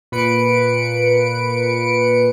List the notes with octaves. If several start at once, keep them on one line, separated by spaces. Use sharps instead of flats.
A#2 B4 C#7 D7